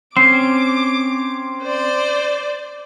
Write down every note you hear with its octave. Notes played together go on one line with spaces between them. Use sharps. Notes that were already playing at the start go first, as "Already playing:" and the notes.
C4 C#4 D6 C7
C5 D5